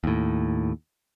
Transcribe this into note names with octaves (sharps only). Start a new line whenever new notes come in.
D#2 A2